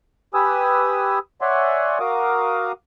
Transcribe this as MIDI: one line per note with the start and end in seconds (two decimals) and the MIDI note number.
0.34 1.19 67
0.34 1.19 71
0.34 1.19 80
0.34 1.19 87
0.34 1.19 88
1.41 1.98 73
1.41 1.98 74
1.41 1.98 76
1.41 1.98 78
1.41 1.98 80
1.41 1.98 84
2.00 2.72 66
2.00 2.72 70
2.00 2.72 77
2.00 2.72 86
2.00 2.72 87